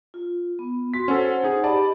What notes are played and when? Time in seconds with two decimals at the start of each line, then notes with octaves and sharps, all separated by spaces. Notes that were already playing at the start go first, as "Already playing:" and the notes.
0.14 F4
0.59 B3
0.94 F#4 C6 B6
1.08 C#4 A4 C5 F#5
1.44 D#4 G#4
1.64 G4 D5 D#5 A5 B5